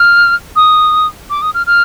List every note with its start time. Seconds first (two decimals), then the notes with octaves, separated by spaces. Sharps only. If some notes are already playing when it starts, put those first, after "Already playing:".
Already playing: F6
0.56 D#6
1.30 D6
1.42 D#6
1.54 F6
1.67 F6